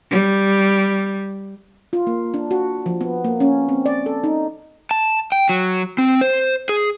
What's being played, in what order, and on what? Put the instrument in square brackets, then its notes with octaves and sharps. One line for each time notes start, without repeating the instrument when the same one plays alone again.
[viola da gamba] G3
[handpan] F4
A#3
D4
F#4
F3
B3
A#3
C#4
C4
D5
A4
D#4
[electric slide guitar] A5
G5
F#3
C4
C5
G#4